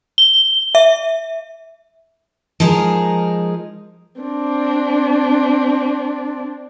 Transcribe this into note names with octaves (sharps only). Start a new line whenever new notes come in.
G7
E5
F3 G#3 D#4 G#4 A#4
C4 D4